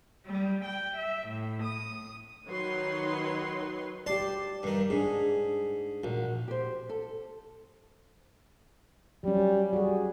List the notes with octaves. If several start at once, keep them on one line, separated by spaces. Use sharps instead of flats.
G3
G5
E5
A2
D#6
D#3 F#3 D#4 B4 C#5 C6
G4 D5 A5 C6
G2 D#3
G#2 D4 G#4
A#1 F#4
G4 C5
A4
F#3 G3 C#4
G3 F#4 G#4